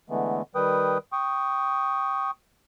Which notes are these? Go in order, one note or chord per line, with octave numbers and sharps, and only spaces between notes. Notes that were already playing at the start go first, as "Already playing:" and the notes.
D3 E3 G#3 A3 B3
D#3 G3 B4 G5 D#6
G5 C#6 D#6